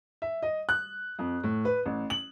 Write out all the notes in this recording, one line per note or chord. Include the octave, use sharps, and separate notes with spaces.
E5
D#5
F#6
F2
A2
B4
A1
F#7